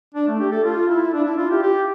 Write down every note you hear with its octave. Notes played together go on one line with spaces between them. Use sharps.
D4
A3
G4
A4
F4
E4
D4
E4
F4
G4
G4